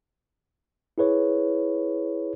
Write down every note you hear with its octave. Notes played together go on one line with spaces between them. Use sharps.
E4 G#4 B4 C#5